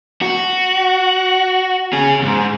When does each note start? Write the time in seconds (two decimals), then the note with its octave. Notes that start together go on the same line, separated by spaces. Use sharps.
0.22 F#4
1.93 C#4 G#4
2.21 D#2 G#2